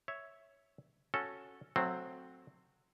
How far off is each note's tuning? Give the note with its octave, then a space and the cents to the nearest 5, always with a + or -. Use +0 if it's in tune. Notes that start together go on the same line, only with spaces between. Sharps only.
C#5 +0 E5 -5
C#4 +0 F#4 -10 A4 +0
F#3 -20 A3 +0 C4 +0